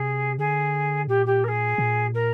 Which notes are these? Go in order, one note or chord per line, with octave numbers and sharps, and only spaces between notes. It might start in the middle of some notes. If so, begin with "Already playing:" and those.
Already playing: C3 G#4
D3 G#4
A#2 G4
G4
A#4
G#4
A#2
A#4